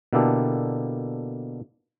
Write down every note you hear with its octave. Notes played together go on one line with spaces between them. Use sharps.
B2 D3 A#3 E4 G4 A4